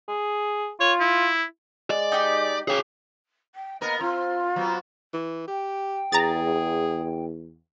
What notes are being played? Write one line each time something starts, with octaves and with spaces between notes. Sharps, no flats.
G#4
F4 C#5
E4
G#3 D5
D#4 G4
C#3 G#4 G5
G5
A#3 B3 A#4 D#5
C4 F4
F#3 B3 C4
E3
G4 G5
E2 G#4 A#5 A6